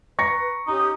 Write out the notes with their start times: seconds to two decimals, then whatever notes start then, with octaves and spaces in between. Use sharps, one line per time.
0.19 B4 A#5 C#6 A#6 C#7
0.67 C#4 D#4 G4 D#6